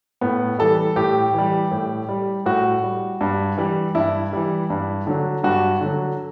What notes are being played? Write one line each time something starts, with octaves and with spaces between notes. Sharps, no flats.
A2 B3
E3 G3 A4
A2 G4
E3 G3
A2
G3
A2 F#4
G3
G2
E3 G3
G2 E4
E3 G3
G2
D3 F#3
G2 F#4
D3
F#3